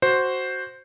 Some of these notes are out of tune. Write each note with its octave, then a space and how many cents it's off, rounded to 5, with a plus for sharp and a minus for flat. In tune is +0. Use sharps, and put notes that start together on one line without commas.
F#4 +5 C5 +0